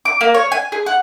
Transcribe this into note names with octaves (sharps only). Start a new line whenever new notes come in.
D6
A#3
C#5
G#5
G#4
F#5